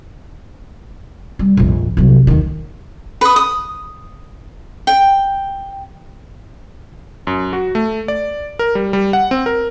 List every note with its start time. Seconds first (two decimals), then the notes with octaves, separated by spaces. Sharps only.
1.39 G3
1.57 A#1 F2
1.97 C2 F#3
2.27 D#2 D#3
3.21 B4 D#6
3.36 D#6
4.87 G5
7.27 F#2
7.53 F#4
7.75 A3
8.08 D5
8.59 A#4
8.75 G3
8.93 G3
9.13 F#5
9.31 C4
9.46 A#4